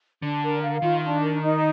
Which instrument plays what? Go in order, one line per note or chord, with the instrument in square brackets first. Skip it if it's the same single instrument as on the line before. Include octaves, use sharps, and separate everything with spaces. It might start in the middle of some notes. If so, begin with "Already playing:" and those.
[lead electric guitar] D3 [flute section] D4
[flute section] A#4
F5
[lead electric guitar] D#3 [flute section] F4
[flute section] D4
A#4
D#4